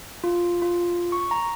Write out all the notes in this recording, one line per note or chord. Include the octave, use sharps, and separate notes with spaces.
F4
F4
C#6
A#5